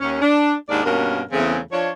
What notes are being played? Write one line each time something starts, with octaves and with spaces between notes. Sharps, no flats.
D#2 C#4
D4
D#2 G#2 D4 A#4 D5
G2 B2 A#3 C#4 A#4
E2 C#3 E3 A3 C4 G#4
F3 D4 F4 C#5